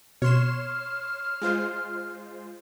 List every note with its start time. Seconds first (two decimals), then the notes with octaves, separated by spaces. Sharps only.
0.22 B2 C#5 C6 F6 E7
1.42 G#3 F4 C5